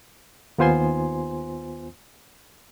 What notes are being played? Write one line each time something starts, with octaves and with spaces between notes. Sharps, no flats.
D#2 B3 F4 C5 G#5 C6